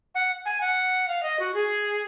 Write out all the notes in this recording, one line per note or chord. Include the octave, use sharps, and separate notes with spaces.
F#5
G#5
F#5
F5
D#5
F#4
G#4